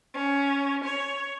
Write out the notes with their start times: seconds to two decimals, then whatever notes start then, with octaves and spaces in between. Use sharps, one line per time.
0.14 C#4
0.85 C#5